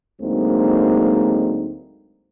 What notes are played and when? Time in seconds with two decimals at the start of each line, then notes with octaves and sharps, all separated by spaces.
0.20 D2 F#3 G#3 A#3 C4 D#4